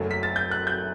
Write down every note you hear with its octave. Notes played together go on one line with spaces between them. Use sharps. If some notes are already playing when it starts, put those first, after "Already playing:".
Already playing: F#1 F#2 F#3 A3
B6
A6
G6
F#6
G6